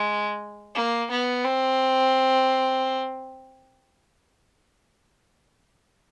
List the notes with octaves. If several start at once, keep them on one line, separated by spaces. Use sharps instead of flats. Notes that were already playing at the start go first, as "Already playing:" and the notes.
Already playing: G#3
A#3
B3
C4